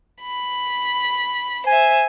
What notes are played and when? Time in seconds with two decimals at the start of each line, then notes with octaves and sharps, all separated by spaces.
0.22 B5
1.67 C5 E5 G#5